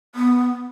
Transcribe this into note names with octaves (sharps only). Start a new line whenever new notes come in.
B3